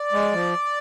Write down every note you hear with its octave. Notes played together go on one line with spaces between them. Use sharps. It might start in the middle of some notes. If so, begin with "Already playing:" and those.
Already playing: D5
G#3
F3